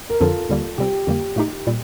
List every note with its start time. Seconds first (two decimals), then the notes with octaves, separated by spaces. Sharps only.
0.10 A#4
0.20 F2 D3 F3 F4 A4
0.49 D#2 D3 G3 A#3
0.78 C3 G3 C4 G4
1.07 F2 D3 G3 A#3
1.36 A2 A3 D#4 G4
1.67 A#2 G3